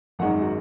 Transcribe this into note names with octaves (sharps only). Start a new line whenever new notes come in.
G#1 F#2 D#3 G#3 F#5
F#4